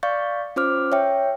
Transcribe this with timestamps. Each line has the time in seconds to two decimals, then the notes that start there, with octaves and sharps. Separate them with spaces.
0.03 D5 F5 C#6 G6 A6
0.56 C#4 F4 C5 D6 F6
0.92 C#5 E5 G5